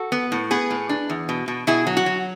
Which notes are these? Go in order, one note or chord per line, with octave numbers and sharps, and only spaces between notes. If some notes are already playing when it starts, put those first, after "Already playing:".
Already playing: F#4 A4
B3
A2
B3 G#4 B4
A2
D4
E2
B2
B2
B2 E4 G#4
F#3
F#4
F#3